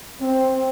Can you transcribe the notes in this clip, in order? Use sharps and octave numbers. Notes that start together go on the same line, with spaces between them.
C4